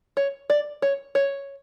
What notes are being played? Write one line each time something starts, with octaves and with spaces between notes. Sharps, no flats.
C#5
D5
C#5
C#5